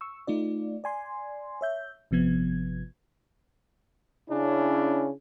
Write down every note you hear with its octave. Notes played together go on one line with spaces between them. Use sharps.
C#6 E6
A3 D#4 F4 D5
D5 G#5 C6
C#5 E5 G6
G#1 C3 F3 B3 G#6
C#3 C#4 D4 E4